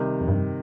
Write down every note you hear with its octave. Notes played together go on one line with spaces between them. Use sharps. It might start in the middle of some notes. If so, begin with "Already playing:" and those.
Already playing: C3 D#3 G3
F2
G2